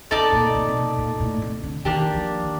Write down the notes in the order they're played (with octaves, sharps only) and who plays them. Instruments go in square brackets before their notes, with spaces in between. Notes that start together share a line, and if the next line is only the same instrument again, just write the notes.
[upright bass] C3 [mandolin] D#4 A4 D5 A5
[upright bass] A#2
C3
C3
A#2
A#2
A2
C3
D3
[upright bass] D#3 [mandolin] A#3 D4 G4
[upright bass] F3
D#3